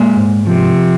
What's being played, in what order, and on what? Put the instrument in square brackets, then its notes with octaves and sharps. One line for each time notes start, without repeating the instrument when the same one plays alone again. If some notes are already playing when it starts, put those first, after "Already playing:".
Already playing: [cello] A#2 [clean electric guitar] G#3
[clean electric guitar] G#2
[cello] C3 [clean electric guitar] F3